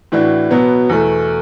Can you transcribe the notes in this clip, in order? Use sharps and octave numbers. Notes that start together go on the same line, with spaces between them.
A2 E3 D4 F#4
B2 F#3 B3
E2 B2 A3